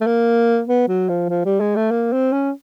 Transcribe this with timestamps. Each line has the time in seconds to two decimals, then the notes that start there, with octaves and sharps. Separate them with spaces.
0.01 A3
0.06 A#3
0.67 B3
0.88 F#3
1.09 F3
1.29 F3
1.45 G3
1.60 G#3
1.76 A3
1.91 A#3
2.12 C4
2.32 C#4